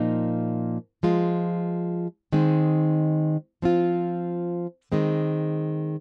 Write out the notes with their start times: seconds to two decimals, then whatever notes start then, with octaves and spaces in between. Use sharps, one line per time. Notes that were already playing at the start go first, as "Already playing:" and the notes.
Already playing: A#2 F3 A#3 D#4
1.03 F3 G#3 F4
2.32 D#3 G#3 C4 D#4
3.62 F3 C4 F4
4.92 D#3 G#3 C4